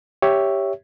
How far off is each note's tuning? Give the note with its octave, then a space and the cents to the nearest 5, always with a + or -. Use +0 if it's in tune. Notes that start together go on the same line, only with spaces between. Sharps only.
G4 +5 C#5 +5 E5 +0